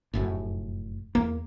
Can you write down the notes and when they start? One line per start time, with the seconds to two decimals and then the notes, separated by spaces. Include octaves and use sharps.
0.14 F1 F#2 A2
1.15 E2 A#3